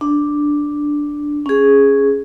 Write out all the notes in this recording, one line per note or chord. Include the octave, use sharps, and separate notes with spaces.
D4
C#4 G#4